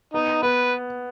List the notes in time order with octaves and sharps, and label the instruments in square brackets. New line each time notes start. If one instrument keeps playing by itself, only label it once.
[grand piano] B3 [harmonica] D#4
[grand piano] B3 [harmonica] B4